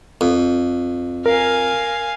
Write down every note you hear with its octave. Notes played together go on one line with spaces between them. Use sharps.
F2
A#4 F5 G#5